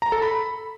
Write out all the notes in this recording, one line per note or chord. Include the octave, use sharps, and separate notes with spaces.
A#5
A4
B5